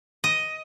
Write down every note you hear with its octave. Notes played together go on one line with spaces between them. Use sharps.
D#5